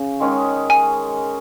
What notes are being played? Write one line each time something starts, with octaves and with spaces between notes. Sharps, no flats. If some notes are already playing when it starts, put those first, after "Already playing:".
Already playing: C#3
D#3 G#3 C#4
G#5